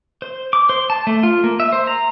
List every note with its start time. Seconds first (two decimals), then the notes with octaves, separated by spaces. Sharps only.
0.22 C5
0.53 D6
0.69 C5
0.90 A5
1.07 A3
1.23 F4
1.44 A#3
1.60 E5
1.72 C5
1.87 A#5